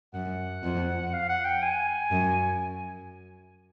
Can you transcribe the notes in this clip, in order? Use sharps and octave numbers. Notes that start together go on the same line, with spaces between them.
F#2 F#5
F2
F5
F#5
G5
G#5
F#2